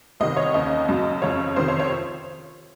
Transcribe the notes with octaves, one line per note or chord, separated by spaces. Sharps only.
C2 C3 D#3 D#5
C#5
D#2 C#3 D#5
F#2 C#3
F2 C#3 C#5
F2 C3 D#3 C5
C#5
C#5